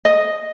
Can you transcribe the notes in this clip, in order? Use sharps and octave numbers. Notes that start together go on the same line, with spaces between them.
D#5